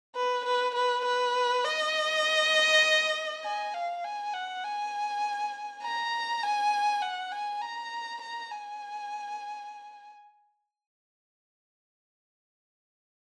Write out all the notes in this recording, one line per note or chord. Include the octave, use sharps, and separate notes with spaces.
B4
B4
B4
B4
D#5
G#5
F5
G#5
F#5
G#5
A#5
G#5
F#5
G#5
A#5
A#5
G#5